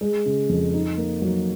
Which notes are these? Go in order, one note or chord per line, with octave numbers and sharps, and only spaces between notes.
G#3
C#3
F2
D#4
A#3
F#3